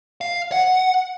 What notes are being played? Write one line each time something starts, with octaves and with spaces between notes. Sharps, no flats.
F5
F#5